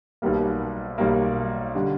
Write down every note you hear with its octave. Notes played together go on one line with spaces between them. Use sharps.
B1 B2 G3 A#3
B1 B2 G3 A#3
D3 G3